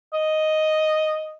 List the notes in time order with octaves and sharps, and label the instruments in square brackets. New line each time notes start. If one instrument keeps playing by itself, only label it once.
[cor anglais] D#5